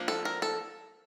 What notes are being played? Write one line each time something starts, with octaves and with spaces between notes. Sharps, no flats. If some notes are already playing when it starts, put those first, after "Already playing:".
Already playing: F3 A#3 D4
A4
A#4
A4